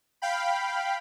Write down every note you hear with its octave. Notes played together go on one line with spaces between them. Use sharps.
F5 G5 B5